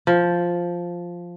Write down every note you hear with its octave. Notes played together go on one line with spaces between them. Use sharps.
F3